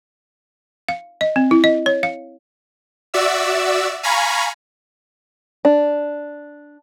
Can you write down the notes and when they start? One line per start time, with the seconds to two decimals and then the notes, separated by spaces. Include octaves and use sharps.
0.89 F5
1.21 D#5
1.36 C4
1.51 E4
1.64 D#5
1.86 C#5
2.03 F5
3.14 F#4 D5 E5 E6
4.03 F5 G#5 A#5 B5 C#6
5.65 D4